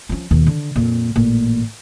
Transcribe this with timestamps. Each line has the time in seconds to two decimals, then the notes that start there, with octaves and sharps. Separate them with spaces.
0.09 F3 C#4
0.31 D#2 B2
0.47 D3
0.76 F2 A#2
1.16 A1 A#2